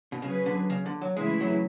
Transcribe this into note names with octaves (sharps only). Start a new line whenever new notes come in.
B2
C#3 F#3 C#4 G#4 B4
D3
C#3
D3
F#3
C#3 E3 G#3 A3 E4 G#4
F#3